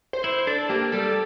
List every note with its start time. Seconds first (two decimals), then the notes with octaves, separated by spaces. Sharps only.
0.13 C5
0.24 E4
0.47 D4 A4
0.69 A#3 G4
0.92 G3 A4